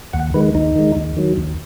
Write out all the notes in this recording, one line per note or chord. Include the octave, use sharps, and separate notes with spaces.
D#2 F#5
D#3 G#3 B4
D#2 D#4
D#3 G#3
D#2
D#3 F#3
D#2